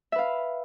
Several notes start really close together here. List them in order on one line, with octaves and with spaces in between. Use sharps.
E5 B4 F5